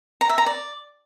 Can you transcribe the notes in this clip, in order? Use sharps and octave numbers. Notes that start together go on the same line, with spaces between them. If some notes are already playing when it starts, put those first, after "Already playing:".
A#5
E5
A#5
D5